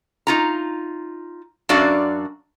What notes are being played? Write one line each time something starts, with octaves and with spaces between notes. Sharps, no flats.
D#4 F4 A#5
F#2 D4 F#4 D5 F5